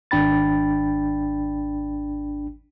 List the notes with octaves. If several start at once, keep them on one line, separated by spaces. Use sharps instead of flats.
G#1 D4 G5 B5 A6